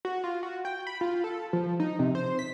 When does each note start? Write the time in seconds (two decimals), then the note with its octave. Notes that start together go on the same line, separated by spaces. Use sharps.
0.05 F#4
0.24 F4
0.43 F#4
0.65 G5
0.87 B5
1.01 F4
1.24 A4
1.53 F3
1.80 D#4
1.99 C3
2.15 C5
2.39 B6